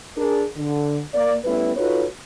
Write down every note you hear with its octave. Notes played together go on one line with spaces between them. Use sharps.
D4 G#4 A#4
D3
A#3 D5
G3 A3 B3 C#4 E4 B4
D#4 F4 F#4 A4 B4 C#5